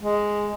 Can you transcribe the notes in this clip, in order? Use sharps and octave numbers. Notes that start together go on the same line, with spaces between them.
G#3